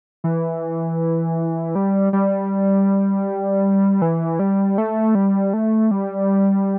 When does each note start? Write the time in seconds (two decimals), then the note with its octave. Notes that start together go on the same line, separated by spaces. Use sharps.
0.24 E3
1.75 G3
2.13 G3
4.02 E3
4.39 G3
4.78 A3
5.15 G3
5.53 A3
5.91 G3